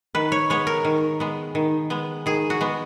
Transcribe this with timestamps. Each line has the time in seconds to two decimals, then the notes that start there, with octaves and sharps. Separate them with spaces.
0.15 D#3 B4
0.32 C#5
0.50 G#3 B3 C#5
0.67 A#4
0.85 D#3
1.20 G#3 B3
1.55 D#3
1.90 G#3 B3
2.26 D#3 G#4
2.50 F#4
2.61 G#3 B3